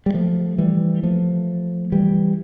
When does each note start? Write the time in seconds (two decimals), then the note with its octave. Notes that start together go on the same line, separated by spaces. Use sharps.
0.06 G3
0.14 F3 A3
0.58 E3 G3
1.03 F3 A3
1.92 E3 G3